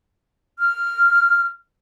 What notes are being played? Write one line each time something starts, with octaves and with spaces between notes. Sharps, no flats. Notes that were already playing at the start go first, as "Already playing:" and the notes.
F6